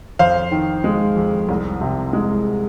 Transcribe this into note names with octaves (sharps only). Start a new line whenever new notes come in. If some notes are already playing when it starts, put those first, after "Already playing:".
F2 C5 F5
D#3
G#3
F2
C2
C3
G#3